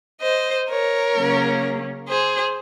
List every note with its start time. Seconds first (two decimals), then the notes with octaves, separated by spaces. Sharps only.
0.21 C5 D#5
0.69 A#4 C#5
1.15 C#3 F#3 A#3 C#4
2.07 G#4 C5